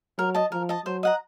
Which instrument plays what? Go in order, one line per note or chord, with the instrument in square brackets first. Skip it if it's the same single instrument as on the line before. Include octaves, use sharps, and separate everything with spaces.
[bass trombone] F#3 [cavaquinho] A#4
[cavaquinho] D#5 A5
[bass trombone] F3 [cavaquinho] A#4
[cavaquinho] D#5 A5
[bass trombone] F#3 [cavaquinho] C5
[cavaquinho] D#5 F#5 A#5